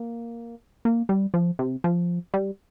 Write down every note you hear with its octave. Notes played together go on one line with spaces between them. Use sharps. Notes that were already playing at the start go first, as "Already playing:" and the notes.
Already playing: A#3
A#3
G3
F3
C3
F3
G3